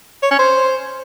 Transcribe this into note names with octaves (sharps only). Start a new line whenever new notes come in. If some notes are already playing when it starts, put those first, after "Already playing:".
C#5
C#4
C5